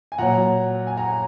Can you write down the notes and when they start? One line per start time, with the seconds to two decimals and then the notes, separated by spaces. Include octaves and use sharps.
0.12 G#5
0.18 A#2 F#3 F#5 A#5
0.87 G#5
0.97 F#5 A#5